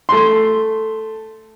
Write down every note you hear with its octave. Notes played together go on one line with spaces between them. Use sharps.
A3 C6